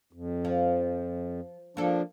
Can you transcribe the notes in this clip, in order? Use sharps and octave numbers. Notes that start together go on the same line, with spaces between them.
F2
F3
F3 A#3 D4 A4